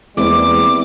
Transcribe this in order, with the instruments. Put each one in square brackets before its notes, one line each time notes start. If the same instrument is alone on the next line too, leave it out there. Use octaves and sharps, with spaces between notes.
[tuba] E2 [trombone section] E3 G3 E4 [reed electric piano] G#3 A#3 C4 [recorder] D6